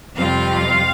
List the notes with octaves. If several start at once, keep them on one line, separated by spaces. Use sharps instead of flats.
F2 C3 G3 C4 F4 F5